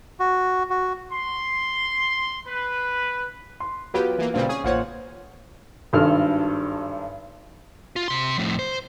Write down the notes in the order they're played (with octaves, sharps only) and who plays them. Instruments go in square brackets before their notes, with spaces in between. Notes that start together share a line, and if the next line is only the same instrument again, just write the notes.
[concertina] F#4
F#4
[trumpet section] C6
B4
[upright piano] C6
[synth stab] F#3 G4 [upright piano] B3 F4 B4
[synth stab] E3 A#3
[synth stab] G2 A#2 G3 [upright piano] C#3 C4 F5
[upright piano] C#4 [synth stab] G#4
[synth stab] A1 A#2 F#5 [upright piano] F4 C5 C#5
[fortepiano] G#1 G2 A4 F6
[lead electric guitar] F4
C3 C6
F2 A2
C5